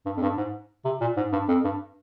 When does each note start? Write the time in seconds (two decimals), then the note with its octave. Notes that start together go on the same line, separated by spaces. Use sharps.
0.05 G2
0.17 F2
0.22 G2
0.37 G#2
0.85 C3
1.01 A#2
1.16 G#2
1.32 G2
1.48 F2
1.64 G2